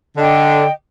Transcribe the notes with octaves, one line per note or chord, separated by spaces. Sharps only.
D3 D#5 G5